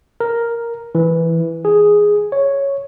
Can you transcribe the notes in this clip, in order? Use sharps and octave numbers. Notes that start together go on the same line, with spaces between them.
A#4
E3
G#4
C#5